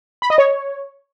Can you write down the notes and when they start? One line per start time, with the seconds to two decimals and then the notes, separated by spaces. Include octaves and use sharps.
0.22 B5
0.30 D#5
0.38 C#5